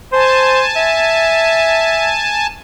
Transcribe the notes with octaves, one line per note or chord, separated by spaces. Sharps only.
C5 G#5 A5
E5